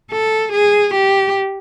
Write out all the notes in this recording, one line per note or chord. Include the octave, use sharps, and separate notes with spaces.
A4
G#4
G4